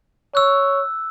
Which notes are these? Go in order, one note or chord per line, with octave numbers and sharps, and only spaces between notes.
C#5 E6 F#6